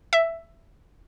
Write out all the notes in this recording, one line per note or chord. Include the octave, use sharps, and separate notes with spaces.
E5